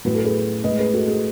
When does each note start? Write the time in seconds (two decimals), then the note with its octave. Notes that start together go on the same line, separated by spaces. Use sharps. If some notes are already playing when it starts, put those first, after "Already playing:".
0.05 A2 F#3 B4
0.15 A4
0.24 G#4 B4
0.64 A2 G#3 B4 D#5
0.79 G#4 B4
0.94 F#4 A4
1.08 G#4 B4